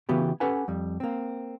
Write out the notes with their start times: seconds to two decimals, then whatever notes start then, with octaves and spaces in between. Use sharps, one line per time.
0.09 C#3 E3 B3 F#4 G4
0.40 C#4 G4 A4 B4 F#5 G#5
0.68 F2 G3
1.00 A#3 C4